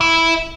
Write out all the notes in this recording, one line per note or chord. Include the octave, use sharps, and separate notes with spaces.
E4